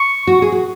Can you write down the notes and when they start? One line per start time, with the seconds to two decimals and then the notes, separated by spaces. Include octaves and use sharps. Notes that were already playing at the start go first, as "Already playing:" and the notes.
Already playing: C#6
0.27 F#4
0.42 G#4
0.52 F#4